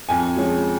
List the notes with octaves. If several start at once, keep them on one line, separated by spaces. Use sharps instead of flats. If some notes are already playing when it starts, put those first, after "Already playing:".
F2 G#5
F3 G#3 C#4